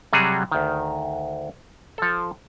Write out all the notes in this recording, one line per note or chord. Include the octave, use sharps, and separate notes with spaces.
C3 F#3 G3 F#4 G#4
D2 D#3
F3 A4